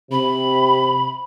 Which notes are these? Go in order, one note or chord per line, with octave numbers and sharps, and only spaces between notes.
C3 B5